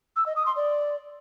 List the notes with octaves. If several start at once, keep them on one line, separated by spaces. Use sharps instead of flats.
E6
D#5
D#6
C6
D5